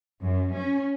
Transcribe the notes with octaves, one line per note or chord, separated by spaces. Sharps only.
F#2
C#4